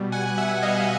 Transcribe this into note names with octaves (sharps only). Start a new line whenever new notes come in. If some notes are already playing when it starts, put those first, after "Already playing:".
Already playing: B2 G3
F#5 G#5
E5 F#5
D#5 F5